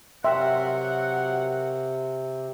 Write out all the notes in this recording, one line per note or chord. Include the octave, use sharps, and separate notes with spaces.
C3 F#3 A#4 E5 F#5 G5 C6